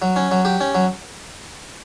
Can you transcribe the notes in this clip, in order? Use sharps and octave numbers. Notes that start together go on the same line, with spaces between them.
F#3
C#4
F#3
G4
C#4
F#3